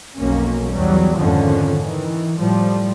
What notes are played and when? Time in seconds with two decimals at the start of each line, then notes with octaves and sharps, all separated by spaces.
0.16 B1 F2 F#3 A#3 C#4
0.71 E2 F#3 G3
1.18 F2 G#2 D3 D#3 F3 C#4
1.79 D#3 E3
2.38 A2 F3 G3